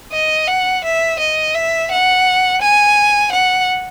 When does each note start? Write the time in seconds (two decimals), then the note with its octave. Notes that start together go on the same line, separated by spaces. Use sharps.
0.12 D#5
0.48 F#5
0.84 E5
1.19 D#5
1.55 E5
1.91 F#5
2.62 G#5
3.32 F#5